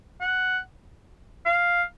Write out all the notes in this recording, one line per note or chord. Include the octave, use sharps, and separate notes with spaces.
F#5
F5